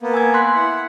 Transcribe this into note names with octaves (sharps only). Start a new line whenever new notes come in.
A#3 B3
G#5 E6 G#6
C6 F#6 B6
E4 F#5